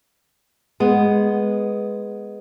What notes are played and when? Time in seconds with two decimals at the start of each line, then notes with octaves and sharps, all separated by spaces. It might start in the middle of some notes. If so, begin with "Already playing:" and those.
0.80 G#3 B3